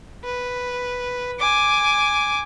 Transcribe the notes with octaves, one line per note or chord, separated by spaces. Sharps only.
B4
G#5 D6